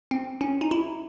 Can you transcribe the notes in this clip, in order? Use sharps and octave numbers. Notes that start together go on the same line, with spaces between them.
C4
C#4
D#4
E4